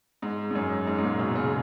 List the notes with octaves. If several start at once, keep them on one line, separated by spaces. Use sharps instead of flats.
G#2
G#2
F#2
G#2
G#2
A#2
B2
C#3